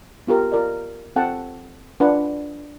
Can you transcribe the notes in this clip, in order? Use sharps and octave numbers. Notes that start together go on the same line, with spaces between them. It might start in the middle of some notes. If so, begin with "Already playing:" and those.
B3 F4 G4 A#4
F4 A#4 D5 D#5
C4 F4 A4 F#5 G5 A5
D4 F4 B4 F#5